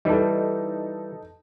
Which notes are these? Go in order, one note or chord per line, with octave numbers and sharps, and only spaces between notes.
E3 G3 D#4 A4